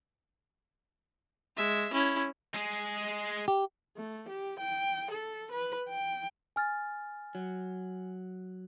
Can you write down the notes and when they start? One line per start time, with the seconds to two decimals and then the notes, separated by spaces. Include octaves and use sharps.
1.56 G#3 E5
1.93 C#4 E4
2.54 G#3 G#4
3.48 G4
3.97 A3
4.29 G4
4.60 G5
5.11 A4
5.52 B4
5.89 G5
6.56 G#5 F6 A6
7.35 F#3